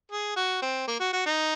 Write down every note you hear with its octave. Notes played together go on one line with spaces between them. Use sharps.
G#4
F#4
C4
A#3
F#4
F#4
D#4